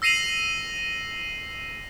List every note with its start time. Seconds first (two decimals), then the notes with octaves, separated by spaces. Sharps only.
0.02 E6 A#6 C7 D#7 F7 F#7